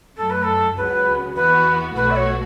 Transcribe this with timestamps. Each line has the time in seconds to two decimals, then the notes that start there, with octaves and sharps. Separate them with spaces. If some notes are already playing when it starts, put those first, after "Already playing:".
0.17 F#2 F#3 A3 A4
0.30 B4
0.43 A4
0.77 C#2 C#3 F#3 B3 B4
1.36 E2 E3 B3 F#4 B4
1.96 B1 B2 A3 F#4 B4
2.11 E5
2.16 C#5